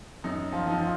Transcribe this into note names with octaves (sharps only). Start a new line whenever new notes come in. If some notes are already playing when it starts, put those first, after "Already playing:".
F#2 D#4
F3 F4
F3 D#4
F3 F4